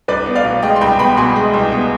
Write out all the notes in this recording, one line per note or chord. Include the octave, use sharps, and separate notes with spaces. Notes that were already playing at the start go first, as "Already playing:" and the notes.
C2 B4 D5
B3
D5 F5
B2
G#3 D#5 G5
C6
C2 G5 B5
B3 G5 B5
B2 G#5 C6
G#3
C2
B3